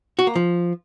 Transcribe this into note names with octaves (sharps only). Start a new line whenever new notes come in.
F#4
A#3
F3